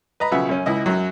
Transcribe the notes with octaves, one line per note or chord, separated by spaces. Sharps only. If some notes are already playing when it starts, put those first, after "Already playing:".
B4 D#5 A#5 B5
B1 C#3 F3 E5 F#5
F#2 C#4
C#2 E4 D#5
F#2 F#3